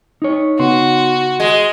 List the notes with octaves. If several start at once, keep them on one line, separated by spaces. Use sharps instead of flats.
D#4 C#5
C#3 B3 F#4 C6
G#3